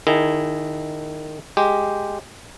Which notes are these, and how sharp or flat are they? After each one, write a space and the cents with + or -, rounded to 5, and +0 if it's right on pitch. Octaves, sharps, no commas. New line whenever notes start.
D#3 -20 E4 +0 G#4 +0
G#3 +0 G4 +0